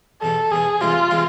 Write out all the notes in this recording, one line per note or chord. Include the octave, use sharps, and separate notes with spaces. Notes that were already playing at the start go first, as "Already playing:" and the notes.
E2 B2 B3 A4
E2 B2 B3 G#4
E2 C3 E3 G#3 C4 F4
C3 E3 G#3 C4